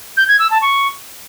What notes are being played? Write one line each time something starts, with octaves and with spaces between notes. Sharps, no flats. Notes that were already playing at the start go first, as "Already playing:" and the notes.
G6
G#6
E6
A5
C#6